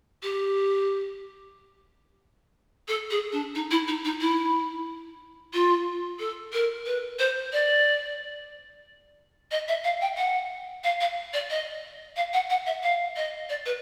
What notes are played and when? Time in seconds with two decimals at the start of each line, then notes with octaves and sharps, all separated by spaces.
0.23 G4
2.88 A4
3.10 G#4
3.32 D4
3.55 D#4
3.71 E4
3.88 D#4
4.05 D#4
4.20 E4
5.53 F4
6.19 A4
6.53 A#4
6.86 B4
7.19 C5
7.52 D5
9.51 D#5
9.68 E5
9.84 F5
10.01 G5
10.17 F#5
10.84 F5
11.00 F5
11.33 D5
11.50 D#5
12.16 F5
12.33 F#5
12.50 F#5
12.66 E5
12.83 F5
13.16 D#5
13.49 D5
13.66 B4